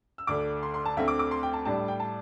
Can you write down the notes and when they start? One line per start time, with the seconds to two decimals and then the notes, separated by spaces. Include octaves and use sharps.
0.18 E6
0.27 D2 D3 A3 D4 D6
0.63 C6
0.74 C6
0.85 A5
0.97 D2 D3 A3 C4 E5
1.08 D6
1.19 D6
1.31 C6
1.43 G5
1.53 A5
1.65 A2 G3 D4 A5
1.88 G5
2.00 A5